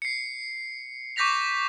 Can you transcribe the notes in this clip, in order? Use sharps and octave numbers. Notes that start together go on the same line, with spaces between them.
C7 C#7
C#6 D6 G6 A#6 B6 F7